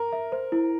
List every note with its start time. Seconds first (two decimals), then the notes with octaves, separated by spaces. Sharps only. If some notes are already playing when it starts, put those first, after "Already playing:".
Already playing: A#4
0.13 E5
0.32 C5
0.52 E4